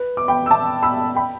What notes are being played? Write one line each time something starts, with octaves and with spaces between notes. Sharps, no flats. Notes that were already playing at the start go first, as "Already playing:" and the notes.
Already playing: B4
D6
G5 B5
E6
A5 D6
B5 E6
G5 B5